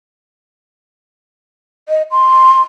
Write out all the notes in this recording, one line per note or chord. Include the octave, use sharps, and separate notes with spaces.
D#5
C6